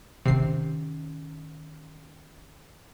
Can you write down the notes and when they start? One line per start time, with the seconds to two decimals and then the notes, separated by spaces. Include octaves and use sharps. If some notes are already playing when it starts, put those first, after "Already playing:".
0.25 C3 D#3 C#4 C7